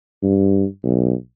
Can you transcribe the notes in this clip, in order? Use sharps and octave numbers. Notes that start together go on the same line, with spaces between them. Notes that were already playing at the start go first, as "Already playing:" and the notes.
G2
B1